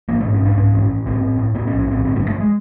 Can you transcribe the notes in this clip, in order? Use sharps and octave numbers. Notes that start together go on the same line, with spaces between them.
A1 A#3
A3
G#2
C#4
G#2 D4
G#2 C#4
A1
A1
A2 C4
A2
A2
A2 B3
C#4
A#1
C#4
A2 C4
G1 C4
A3
G2
A3
G#3